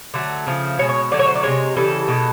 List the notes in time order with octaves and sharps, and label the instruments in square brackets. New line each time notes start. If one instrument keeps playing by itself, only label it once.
[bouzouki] D3 F#3 A3
C#3 F3 A3
B2 C#5
G#3
C#5
D3 F#3 A3 D5
C#5
C5
D5
C3 E3 G#3 C#5
C#3 E3 G3 A4
B2 G#3